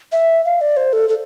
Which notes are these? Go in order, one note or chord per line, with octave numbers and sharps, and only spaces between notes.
E5
F5
D5
C5
A4
A4